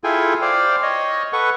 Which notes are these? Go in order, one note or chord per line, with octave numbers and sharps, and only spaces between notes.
E4 F4 G#4 A4 G5 G#5
C5 D5 F5 G5
C#5 D#5
A4 B4 F#5 C#6